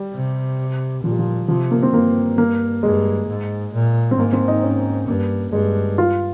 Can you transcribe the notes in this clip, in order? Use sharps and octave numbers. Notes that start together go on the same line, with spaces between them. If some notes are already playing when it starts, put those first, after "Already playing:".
Already playing: G3
C3
A#2 F3
G3
F3
C3 F3
A#3
C4
G2 A#3
A#3
G2 G#3
G#2
A#2
C4
G#2 A#3
C4
D#4
C#4
G2 A#3
G2 G#3
F4